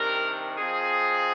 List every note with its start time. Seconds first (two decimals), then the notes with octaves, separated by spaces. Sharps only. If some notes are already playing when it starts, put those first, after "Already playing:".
Already playing: C3 D#3 G3 D4 A#4
0.57 F3 C4 D#4 G#4